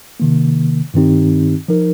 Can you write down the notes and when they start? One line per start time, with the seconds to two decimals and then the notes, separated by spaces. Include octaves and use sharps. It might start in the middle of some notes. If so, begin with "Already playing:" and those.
0.20 C3 D#3 A#3
0.94 G2 D#3 C4 D#4 G4
1.68 F3 D#4 A#4